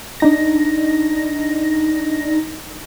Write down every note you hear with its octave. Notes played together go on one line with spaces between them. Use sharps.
D4 D#4 A#6